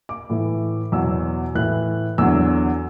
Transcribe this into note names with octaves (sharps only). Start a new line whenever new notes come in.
D6
A2 E3
E2 B2 F#3 E6
A2 E3 F#6
E2 D3 F#3 E6